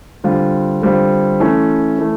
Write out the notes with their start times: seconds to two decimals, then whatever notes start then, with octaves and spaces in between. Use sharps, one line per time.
0.24 D3 G3 C4 F4
0.82 D3 G3 C4 F4
1.40 E3 A3 C#4
1.99 E3 A3